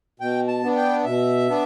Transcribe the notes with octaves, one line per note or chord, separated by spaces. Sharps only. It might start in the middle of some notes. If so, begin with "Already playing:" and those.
B2 G5
A5
B3 D4
G5
B2 E5
B3 D4